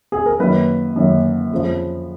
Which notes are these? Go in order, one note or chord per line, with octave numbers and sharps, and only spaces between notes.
G#4
A#4
F#2 D#3 F#3 A#3 B4
F#2 D#3 F#3 A#3
F2 C#3 F3